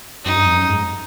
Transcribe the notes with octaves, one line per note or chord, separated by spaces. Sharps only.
F#2 D#4
G2
F2
F#2
G#2